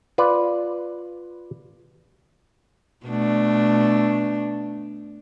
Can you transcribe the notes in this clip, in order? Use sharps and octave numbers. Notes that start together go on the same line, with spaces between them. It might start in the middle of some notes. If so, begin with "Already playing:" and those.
F4 B4 D5
B2 A3 D4